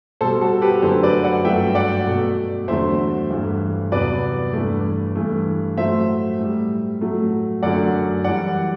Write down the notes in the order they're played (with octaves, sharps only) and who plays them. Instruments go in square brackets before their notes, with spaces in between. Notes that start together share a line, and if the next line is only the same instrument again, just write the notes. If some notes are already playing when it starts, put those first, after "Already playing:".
[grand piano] B2 A4 C5
G3
F#4 A4
G4 B4
F#2 D3 F#3 A3 A4 C5
B4 D5
D5 F#5
G2 F#3 A3 E5 G5
G5
D5 F#5
B2 A3
E2 D3 F#3 A3 C5 E5
G2 E3 A3
E2 C3 F#3 B4 D5
G2 E3 A3
G2 E3 A3
A2 F#3 A3 C5 E5
A2 G3
A2 F#3 A3
F#2 D3 F#3 A3 D5 F#5
F#2 E3 G3 D5 F#5